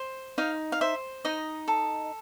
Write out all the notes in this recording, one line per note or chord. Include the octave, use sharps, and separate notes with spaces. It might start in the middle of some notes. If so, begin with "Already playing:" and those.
Already playing: C5
D#4 F5
F5
C5 E5
D#4 D#5
A4